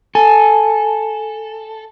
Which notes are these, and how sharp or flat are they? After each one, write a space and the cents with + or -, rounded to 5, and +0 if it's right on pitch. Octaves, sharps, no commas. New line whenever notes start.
A4 +0 G#5 +0